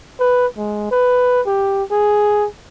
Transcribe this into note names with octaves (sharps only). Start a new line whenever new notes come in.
B4
G#3
B4
G4
G#4